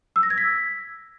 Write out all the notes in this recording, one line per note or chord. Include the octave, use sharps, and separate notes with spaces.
E6
A#6
G#6
B6